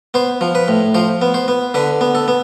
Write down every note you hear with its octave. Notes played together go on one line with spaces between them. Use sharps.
B3 C5
F3
B4
A2
F3 C5
B3
C5
B3
D3 B4
B3
A4
B3